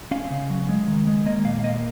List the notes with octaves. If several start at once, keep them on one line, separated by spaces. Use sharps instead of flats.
C#4 F5
C#3
F#3
G#3
D#3
G#3
A#3 D#5
A#2 F5
F5
A#3 D#5